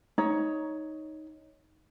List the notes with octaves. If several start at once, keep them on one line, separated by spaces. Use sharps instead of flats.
D#4 C#5